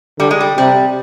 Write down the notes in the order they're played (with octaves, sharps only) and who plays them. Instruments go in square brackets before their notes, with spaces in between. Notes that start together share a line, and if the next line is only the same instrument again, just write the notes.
[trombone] D3 [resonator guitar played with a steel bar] G3
[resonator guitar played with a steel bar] G#3
G3
[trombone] C3 [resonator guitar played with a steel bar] G3